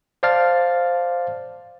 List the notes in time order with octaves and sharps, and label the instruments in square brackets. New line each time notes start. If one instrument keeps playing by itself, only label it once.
[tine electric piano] C5 D5 F5 A5 F6 A6